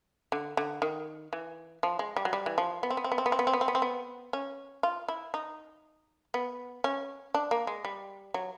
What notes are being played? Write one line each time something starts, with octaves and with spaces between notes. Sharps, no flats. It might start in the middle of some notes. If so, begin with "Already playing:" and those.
D3
D3
D#3
E3
F3
G#3
G3
F#3
G3
E3
F3
B3
C4
B3
C4
B3
C4
B3
C4
B3
C4
B3
C4
B3
C4
B3
C#4
F4
E4
D#4
B3
C#4
D4
A#3
G#3
G3
F#3